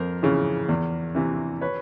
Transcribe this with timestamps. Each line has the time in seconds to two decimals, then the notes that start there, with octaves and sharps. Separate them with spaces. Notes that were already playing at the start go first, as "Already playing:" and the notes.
Already playing: F2 A#4 C5
0.23 C#3 E3
0.69 E2
1.15 C3 E3
1.61 B4 C#5